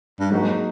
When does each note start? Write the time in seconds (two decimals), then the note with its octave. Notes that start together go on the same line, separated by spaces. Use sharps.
0.20 G2
0.31 G#2 F#3 A#3 D#4 F#4